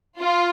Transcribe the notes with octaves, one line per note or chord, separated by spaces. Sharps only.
F4